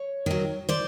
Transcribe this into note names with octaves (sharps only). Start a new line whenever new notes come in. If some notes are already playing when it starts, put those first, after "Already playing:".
Already playing: C#5
D#3 F#3
C5 D5